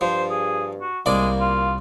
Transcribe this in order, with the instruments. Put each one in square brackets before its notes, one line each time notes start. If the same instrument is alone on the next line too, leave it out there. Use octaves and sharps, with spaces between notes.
[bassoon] G2 [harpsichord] F3 [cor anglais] C5
[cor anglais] G#4
F#4
[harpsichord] C2 D5 [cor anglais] G#3 [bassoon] A#3
[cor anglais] F4